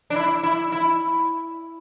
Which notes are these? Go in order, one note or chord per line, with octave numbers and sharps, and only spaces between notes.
D4
E4
E4
E4